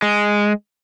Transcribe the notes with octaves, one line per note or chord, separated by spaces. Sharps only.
G#3